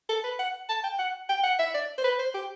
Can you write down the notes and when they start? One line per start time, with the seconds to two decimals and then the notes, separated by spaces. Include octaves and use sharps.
0.09 A4
0.24 B4
0.39 F#5
0.69 A5
0.84 G5
0.99 F#5
1.29 G5
1.43 F#5
1.59 E5
1.74 D5
1.98 C5
2.04 B4
2.19 C5
2.34 G4